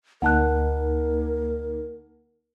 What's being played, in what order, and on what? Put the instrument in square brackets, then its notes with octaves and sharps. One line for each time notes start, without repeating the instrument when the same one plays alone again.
[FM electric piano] D2 A#3 D#4 [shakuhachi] A#4 [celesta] F#5 A5 F#6